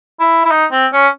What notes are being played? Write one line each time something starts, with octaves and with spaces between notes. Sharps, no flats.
E4
E4
D#4
C4
C#4